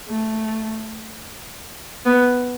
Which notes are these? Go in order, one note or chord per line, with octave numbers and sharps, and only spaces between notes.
A3
B3